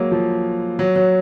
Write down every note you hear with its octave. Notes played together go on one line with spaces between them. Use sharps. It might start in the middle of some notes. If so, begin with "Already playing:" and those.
Already playing: F#3 G#3 A#3
F3
F#3
F#3